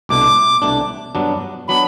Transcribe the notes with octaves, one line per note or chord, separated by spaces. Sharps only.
C2 B2 A3 D4 D6
C2 B2 A3 D4
G2 F#3 B3 D4
F#3 B3 D4 B5